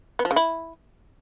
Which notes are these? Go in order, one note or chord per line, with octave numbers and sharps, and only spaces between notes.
B3
F3
C#3
E4